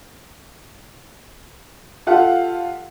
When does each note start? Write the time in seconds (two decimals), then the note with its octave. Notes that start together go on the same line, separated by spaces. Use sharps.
2.07 F4 G4 A4 F5 F#5